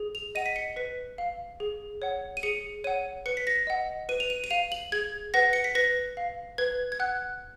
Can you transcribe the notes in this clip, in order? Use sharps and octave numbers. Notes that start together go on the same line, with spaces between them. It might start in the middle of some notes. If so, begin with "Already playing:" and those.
Already playing: G#4
F7
D#5 F#5 D#7
B6
C#7
B4 B6
F5
G#4
C#5 F#5
D#7
G#4 C#7
C#5 F#5 D#7
B4 C#7
B6
A#6
D#5 F#5
B4 D#7
F7
D#7
D#7
F5 F7
F#7
G#4 G#6
B4 F#5 A#6
C#7
B6
B4 A#6
F5
B4 G#6
G#6
F#5 F#6